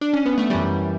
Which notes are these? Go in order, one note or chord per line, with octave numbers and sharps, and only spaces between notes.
D4
C#4
B3
A3
F#2 E3 G3